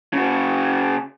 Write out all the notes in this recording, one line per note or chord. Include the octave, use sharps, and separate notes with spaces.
C#3 F#4